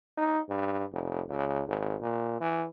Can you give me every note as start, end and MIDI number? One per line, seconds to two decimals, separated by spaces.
0.17 0.40 63
0.50 0.84 43
0.92 1.23 29
1.29 1.62 37
1.67 1.96 32
2.01 2.39 46
2.41 2.66 52